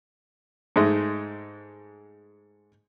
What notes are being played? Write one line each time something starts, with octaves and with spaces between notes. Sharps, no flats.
G#2 G#3 A3